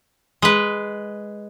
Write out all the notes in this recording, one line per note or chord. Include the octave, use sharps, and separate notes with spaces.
G#3 B4